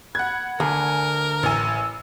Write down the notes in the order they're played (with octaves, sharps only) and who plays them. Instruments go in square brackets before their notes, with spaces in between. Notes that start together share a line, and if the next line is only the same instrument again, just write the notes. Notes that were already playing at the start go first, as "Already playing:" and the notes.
[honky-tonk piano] F#5 G#6 [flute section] B5 F#6
[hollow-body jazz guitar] D2 [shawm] A#4 [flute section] G#5
[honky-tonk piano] A1 G#5 [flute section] E6